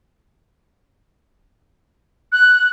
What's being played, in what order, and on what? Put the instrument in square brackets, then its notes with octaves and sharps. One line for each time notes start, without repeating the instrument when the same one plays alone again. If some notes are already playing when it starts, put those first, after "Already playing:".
[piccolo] F#6